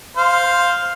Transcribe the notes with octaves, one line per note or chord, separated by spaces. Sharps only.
C5 F5